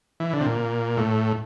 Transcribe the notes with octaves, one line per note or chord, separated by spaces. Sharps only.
E3
D3
C3
A#2
A2